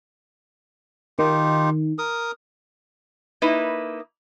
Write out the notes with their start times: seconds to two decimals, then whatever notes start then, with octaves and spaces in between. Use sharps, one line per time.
1.19 D#3 D#4 F4 G4
1.98 A#4 D#6
3.42 A#3 D#4 E4 B4